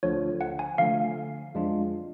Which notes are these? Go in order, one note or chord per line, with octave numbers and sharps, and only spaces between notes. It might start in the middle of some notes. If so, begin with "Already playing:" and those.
D2 D3 F3 C#5
F#5
G#5
D3 F3 A3 F5
F2 F3 G#3 D4 F4